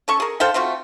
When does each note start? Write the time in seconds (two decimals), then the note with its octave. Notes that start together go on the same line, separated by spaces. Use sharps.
0.08 C#4 A4 C#6
0.20 G#4 A#4
0.40 A4 C5 F5 G5
0.54 A3 C4 F4 F#4